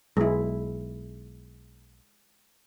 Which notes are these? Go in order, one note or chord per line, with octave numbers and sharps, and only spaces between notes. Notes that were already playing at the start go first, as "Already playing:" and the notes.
B1 G#3 E4